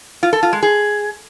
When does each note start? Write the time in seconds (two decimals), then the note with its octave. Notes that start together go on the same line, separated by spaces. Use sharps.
0.23 F4
0.33 A4
0.43 F4
0.53 G#3
0.63 G#4